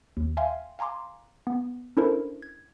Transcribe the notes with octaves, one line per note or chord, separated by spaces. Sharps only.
D#2
E5 F5 G5 G#5 C6
F5 G#5 A#5 C6 D6
B3
C#4 D4 E4 A4 A#4 C5
G#6